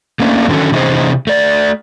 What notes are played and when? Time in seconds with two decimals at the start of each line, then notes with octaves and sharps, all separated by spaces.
0.20 A3 A#3 C#4 D4
0.49 D3 D#3 F#3 C#4 A4
0.72 C3 E3 C#4 D#4 G#4 C5
1.27 A3 D5